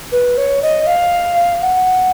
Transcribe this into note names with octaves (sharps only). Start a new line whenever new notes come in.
B4
C#5
D#5
F5
F#5